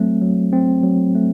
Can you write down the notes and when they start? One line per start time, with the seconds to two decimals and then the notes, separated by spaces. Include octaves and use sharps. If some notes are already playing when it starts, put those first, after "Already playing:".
Already playing: F#3 A3 C4
0.22 F#3
0.53 C4
0.83 F#3
1.15 A3